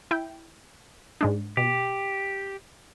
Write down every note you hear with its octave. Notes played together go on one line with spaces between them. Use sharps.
E4 G5
G#2 G#3 D4
B2 G4